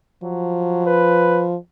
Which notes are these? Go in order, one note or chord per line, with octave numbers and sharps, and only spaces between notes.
F3 F#3
B4